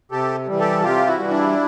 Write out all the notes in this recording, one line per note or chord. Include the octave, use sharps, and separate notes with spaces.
C3 G4 A4
E3 G3
G4 A4
C3 F4 G4
E4 F#4
E3 G3
D4 E4